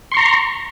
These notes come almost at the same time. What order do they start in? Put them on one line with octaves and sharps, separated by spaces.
C6 C#6 A#5